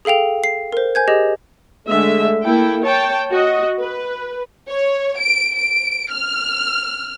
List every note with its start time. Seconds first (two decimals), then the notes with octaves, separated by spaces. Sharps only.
0.05 G#4 A4 F5 G5 F7
0.44 C7
0.72 A#4 C5
0.95 C5 G#5 G6 G#6
1.08 G4 G#4 D#5
1.88 D3 G#3 A3 E5
2.42 A#3 E4 A4 G5
2.83 C#5 G5 A5
3.31 F#4 D#5
3.80 B4
4.69 C#5
5.20 D7
5.56 D7
6.11 F6